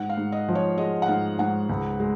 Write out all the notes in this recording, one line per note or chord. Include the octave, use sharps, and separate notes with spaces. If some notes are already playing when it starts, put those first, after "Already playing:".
Already playing: G#2 F#5
F5
G#2
D#5
F3
C#5
G#3 D#5
F#5
G#2 F5
G#2 F#5
C#2
G#3